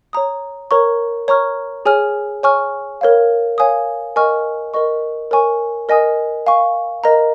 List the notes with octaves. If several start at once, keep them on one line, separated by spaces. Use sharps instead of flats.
C#5 A#5 D#6
A#4 C#5 A#5 C#6
C#5 A#5 C#6 F6
G#4 C#5 G#5 F6
C#5 G#5 C#6 F6
A#4 C#5 F5
C#5 F5 G#5 D#6
A#4 D#5 G#5 C#6 F6
A#4 D#5 C#6
A#4 C#5 G#5 C#6
A#4 D#5 G#5 D#6
F5 G#5 C#6
A#4 D#5 A#5